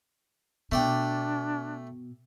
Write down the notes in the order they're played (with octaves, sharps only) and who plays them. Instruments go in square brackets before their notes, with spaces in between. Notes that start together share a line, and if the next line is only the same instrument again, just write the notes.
[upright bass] B2 [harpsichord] A3 D5 G5 [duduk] D4